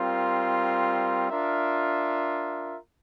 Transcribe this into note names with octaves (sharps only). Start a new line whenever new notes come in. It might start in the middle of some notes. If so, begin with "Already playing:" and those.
Already playing: G3 C4 F4 A#4
D4 F4 A#4 E5